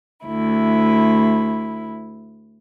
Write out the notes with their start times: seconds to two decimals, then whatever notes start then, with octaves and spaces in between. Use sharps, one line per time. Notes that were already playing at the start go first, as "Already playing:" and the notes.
0.25 D2 E4